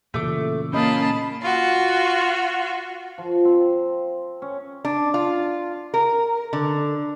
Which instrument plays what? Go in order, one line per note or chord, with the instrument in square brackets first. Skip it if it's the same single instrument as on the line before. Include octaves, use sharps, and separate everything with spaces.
[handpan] A#2 C#3 E3 [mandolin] A3 D6
[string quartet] A#3 F4 A5 [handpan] C#4 [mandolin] D#4 D#5 F5 [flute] B5
[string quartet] F4 F#4
[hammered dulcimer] F3
C4
C#4
[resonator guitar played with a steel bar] D4
F4
A#4
D3